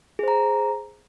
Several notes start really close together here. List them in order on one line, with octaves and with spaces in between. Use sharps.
G#4 C5 A#5